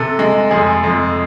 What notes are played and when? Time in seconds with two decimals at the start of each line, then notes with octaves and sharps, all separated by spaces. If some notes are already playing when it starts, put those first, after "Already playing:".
Already playing: C3 A4
0.19 G#3
0.51 F2 G#4
0.84 F2